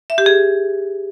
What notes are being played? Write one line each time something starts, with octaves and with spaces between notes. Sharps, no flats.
E5
G4
G#4